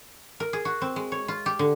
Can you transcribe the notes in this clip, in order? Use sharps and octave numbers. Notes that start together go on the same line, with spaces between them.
A#4
G#4
F#4
C4
G#3
C#5
F4
G4
D3